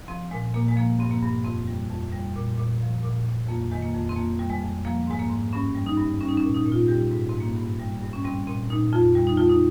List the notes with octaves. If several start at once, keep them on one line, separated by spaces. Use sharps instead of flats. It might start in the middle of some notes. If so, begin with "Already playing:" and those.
F3 C4
A#2 G#3
A#2 A#3
G#3
F3 A#3
G2 C4
A#3
G2
F2 C4
G3
F2
G3
A#2
A#2
F3
A#2
A#2
F2 A#3
D#3 G#3
A#3
F2
C4
F2 A#3
G3
G#3
F2
F3 A#3
G#2 G#3
A#3
G#2
G2 C#4
G3
D#4
G2
G3 C#4
D#4
C#4
A#2
D#4
A#2
F4
G3 G4
G#2
C4
G#2
A#3
G2
G3
G2
C#4
G3 C4
A#2 C4
A#2 D#4
F2 F4
G3
D#4
F2 F4
D#4